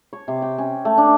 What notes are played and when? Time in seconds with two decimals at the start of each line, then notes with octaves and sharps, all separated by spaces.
0.13 C#5
0.28 C3
0.42 G5
0.58 C#4
0.85 A3
0.98 D4